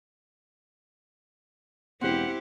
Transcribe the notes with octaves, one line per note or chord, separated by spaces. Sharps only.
E1 C4 E4 G4 C5 F#5